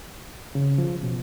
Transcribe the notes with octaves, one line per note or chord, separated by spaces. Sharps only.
C#3
F3
B2